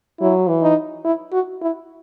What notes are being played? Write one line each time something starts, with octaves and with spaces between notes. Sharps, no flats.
F#3 E4
E3
D#4
E4
F#4
E4